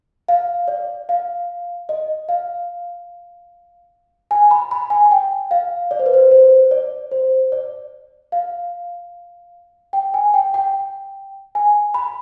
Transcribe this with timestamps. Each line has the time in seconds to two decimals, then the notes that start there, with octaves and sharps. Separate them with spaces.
0.28 F5
0.68 D5
1.09 F5
1.89 D#5
2.29 F5
4.31 G#5
4.51 B5
4.71 B5
4.90 G#5
5.11 G5
5.51 F5
5.91 D5
5.99 C5
6.06 B4
6.14 C5
6.31 C5
6.71 D5
7.11 C5
7.52 D5
8.32 F5
9.93 G5
10.14 G#5
10.34 G5
10.54 G5
11.55 G#5
11.94 B5